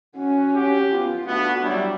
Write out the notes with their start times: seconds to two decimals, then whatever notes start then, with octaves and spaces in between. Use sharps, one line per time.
0.17 C#4 F#4
0.56 G4
0.91 B3 F4
1.27 A3 B3 D4 F#4
1.64 F#3 G3 E4